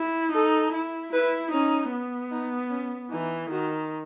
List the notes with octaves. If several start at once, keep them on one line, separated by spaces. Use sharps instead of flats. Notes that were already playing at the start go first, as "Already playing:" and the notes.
Already playing: E4
D#4 A4
E4
E4 B4
C#4 D#4
B3
D#4
C#4
E3 D#4
D#3 F#4